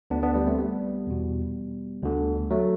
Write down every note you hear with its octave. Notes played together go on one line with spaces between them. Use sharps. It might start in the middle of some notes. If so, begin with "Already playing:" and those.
D2 D3 B3 D4
B3 D4
G3 B3
A3 C4
G3 B3
E2 B2
D2 D3
F#3 A3